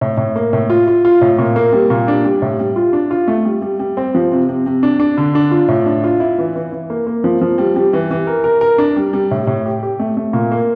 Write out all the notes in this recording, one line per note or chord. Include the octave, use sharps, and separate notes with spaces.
A2
A2
A#3
A2
F4
F4
F4
A2
A#2
A#3
G3
A#2
D4
G3
A2
G3
F4
D4
F4
A3
G3
G3
G3
C4
F3
C3
C3
C3
D4
D4
D3
D4
F4
A2
D4
F4
E4
E3
E3
E3
A#3
A#3
F3
F3
G3
G3
E3
E3
A#4
A#4
A#4
D4
G3
G3
A2
A2
G4
G4
A3
A3
A#2
A#3